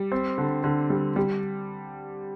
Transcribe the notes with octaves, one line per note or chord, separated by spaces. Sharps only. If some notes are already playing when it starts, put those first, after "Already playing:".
Already playing: G3
C4
D3
D3
G3
G3